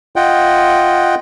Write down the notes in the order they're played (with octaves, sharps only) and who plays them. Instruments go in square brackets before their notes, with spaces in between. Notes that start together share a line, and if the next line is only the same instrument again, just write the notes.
[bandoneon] F4 D#5 F#5 G5